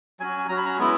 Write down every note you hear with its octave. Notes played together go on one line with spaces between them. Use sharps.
F#3 C#4 F#4 G#5
F#3 C#4 F#4 A#5
B5
A#5
G#3 B3 E4